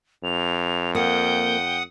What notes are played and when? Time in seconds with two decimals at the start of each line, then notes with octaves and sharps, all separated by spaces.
0.24 F2 F7
0.95 A#3 F#5 G5 D#6